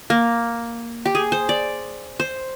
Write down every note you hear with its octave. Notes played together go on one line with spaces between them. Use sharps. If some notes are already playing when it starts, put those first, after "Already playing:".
A#3
G4
G#4
C5
D5
C5